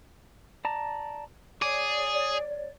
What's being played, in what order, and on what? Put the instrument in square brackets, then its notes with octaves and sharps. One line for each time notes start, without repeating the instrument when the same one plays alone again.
[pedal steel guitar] D5 A5 A#5
[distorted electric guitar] G#4 [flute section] C#5 D5 [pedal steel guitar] D6